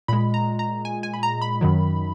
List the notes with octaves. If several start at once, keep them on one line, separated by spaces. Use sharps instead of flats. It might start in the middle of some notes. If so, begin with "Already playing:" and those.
A#2 G#3 B5
A#5
A#5
G#5
G#5
B5
A#5
B5
F#2 D#3 F#3